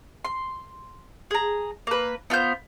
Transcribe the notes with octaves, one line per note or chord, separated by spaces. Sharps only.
C6
G#4 A#5
A#3 B4
B3 F4 C5 G6